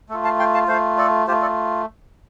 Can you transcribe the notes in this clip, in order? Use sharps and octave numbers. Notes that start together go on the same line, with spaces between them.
A3 F4 A4
F5 A5
G5 C6
F5 A5
A3 F4 C5 F5
A4 D5
A3 F4 G4 C5
A4 D5